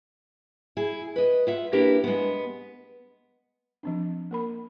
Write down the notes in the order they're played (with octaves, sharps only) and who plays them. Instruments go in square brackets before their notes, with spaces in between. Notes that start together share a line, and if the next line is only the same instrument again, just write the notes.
[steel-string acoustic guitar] E4 G#4
B4 D#5
F4 E5 F#5
A#3 D4 E4 G4 A#4 B4
G#3 B3
[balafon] F3 C4 D4
A#3 A#4 B5